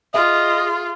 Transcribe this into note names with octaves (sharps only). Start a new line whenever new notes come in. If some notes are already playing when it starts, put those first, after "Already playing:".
F4 G#4 D#5 E5